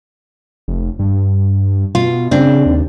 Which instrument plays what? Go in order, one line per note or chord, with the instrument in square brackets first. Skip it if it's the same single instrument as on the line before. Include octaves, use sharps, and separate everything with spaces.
[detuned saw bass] F1
G2
[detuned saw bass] B2 [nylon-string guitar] F4
[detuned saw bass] C#3 [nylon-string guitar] C4 D4
[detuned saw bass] D#2